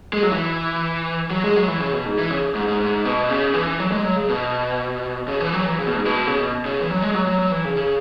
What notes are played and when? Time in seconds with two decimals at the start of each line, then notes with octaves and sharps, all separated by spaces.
0.13 G#3
0.23 F#3
0.32 E3
1.31 F#3
1.44 G#3
1.56 F#3
1.68 E3
1.81 C#3
1.93 B2
2.06 G#2
2.18 E3
2.31 C#3
2.55 G#2
2.68 G#2
2.80 G#2
3.05 B2
3.30 C#3
3.54 E3
3.80 F#3
3.92 G#3
4.05 F#3
4.16 C#3
4.29 B2
5.28 C#3
5.40 E3
5.53 F#3
5.66 E3
5.78 C#3
5.87 B2
5.96 G#2
6.05 B2
6.27 C#3
6.40 B2
6.65 C#3
6.81 E3
6.90 F#3
7.02 G#3
7.14 F#3
7.27 F#3
7.39 F#3
7.51 E3
7.65 C#3
7.76 C#3